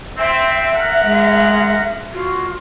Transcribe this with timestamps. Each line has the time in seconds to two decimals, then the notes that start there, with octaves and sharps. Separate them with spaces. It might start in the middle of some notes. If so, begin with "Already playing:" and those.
0.18 C4 E5
0.73 A#4 F#5
1.04 G#3
2.13 F4 F#4